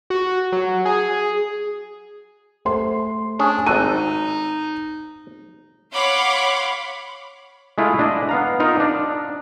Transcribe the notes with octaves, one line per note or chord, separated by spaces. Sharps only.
F#4
F#3
G#4
A3 C5 C6
C#4 D4 G#4 G#5
G#1 D#4 A4 F#6 D#7
C#5 F5 F#5 B5 C6 D6
G#3 A3 E4 F4
D4 D#5
B3 F5 A#5
D#4 F4 A#4
D4